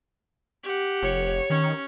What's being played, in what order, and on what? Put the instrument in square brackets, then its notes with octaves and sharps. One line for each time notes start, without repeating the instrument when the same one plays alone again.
[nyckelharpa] G4 F#5
[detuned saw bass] F1 [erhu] C#5
[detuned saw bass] D#3 [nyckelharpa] C#4